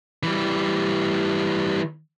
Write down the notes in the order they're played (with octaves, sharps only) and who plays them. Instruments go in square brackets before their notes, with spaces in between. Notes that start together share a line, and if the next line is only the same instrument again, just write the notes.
[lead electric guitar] E3 G3